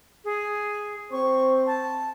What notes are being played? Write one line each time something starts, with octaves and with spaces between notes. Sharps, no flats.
G#4
C4 C5 C#6
A5